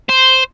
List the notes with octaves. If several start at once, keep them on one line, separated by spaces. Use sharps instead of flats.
C5